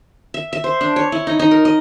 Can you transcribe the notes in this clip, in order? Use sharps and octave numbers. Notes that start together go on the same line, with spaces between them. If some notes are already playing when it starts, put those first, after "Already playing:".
E5
E5
C5
D4
C#5
E4
D#4
D#4
A#4
D#5